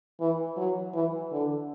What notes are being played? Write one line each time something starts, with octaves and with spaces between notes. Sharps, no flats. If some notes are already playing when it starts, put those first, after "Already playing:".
E3
F#3
E3
D3